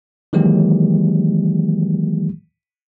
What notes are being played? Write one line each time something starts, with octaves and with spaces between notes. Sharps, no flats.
D#3 E3 F#3 G#3 A#3 G4